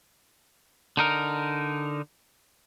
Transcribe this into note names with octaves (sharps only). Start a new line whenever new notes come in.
D3 D#4 A#4